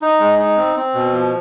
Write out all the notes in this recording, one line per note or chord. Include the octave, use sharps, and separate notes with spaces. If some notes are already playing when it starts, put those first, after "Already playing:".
D#4
G#3
D#4
C4
C4
B2
F3